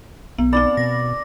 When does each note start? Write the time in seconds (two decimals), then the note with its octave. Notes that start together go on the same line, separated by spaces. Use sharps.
0.38 B1 B3
0.53 C4 D#4 D5 B5
0.77 B2 A#6